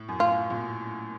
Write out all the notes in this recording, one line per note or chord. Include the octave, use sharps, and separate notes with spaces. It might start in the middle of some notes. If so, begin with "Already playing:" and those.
Already playing: A2
F#2
A2 F4
A#2